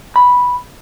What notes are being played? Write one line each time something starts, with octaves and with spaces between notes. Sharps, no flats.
B5